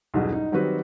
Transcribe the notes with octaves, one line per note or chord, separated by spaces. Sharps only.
B1 E2 G2 B2
D#4
D#3 F#3 G3 C4 F#4 B4